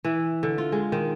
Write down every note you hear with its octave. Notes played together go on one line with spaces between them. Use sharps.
E3
D3
F4
G#3
D#3